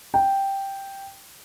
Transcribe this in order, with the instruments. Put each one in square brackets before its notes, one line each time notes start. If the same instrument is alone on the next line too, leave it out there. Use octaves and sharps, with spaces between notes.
[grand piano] G5